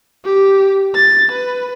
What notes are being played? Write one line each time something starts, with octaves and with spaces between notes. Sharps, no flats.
G4
A6
B4